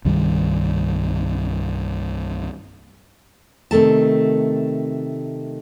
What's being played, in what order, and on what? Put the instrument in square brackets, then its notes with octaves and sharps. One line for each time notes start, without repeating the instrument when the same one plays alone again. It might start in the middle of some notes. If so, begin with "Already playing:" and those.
[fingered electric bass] C2 G2 D#3 G3
[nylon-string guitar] C3 D#3 A3 A5